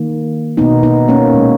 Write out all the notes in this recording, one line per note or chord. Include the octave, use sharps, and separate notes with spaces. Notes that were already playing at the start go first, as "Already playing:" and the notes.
Already playing: D#3 A#3
B2 A#3 B3 D#4
B3 D#4
A#3 C#4
A#2 G#3